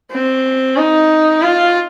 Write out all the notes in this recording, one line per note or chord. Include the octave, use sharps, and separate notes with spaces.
C4
D#4
F4